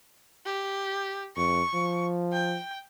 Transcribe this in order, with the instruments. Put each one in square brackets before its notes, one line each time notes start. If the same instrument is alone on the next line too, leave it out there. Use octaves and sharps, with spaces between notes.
[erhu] G4
[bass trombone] F2 [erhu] C#6
[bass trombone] F3
[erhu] G5